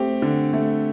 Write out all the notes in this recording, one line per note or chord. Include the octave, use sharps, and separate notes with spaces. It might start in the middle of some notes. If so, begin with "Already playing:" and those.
Already playing: A3 C4 G4
D3
A3